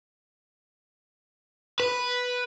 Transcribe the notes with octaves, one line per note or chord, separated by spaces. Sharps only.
B4